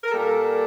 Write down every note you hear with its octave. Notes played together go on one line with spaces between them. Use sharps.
A#4
A#2 G3 A#3 A4